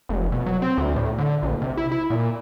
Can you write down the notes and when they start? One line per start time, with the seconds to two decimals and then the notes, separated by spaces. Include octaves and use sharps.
0.09 F1
0.32 B2
0.46 F#3
0.62 C4
0.78 D2
0.96 A2
1.18 D3
1.43 A#1
1.62 C3
1.77 E4
1.92 E4
2.10 A#2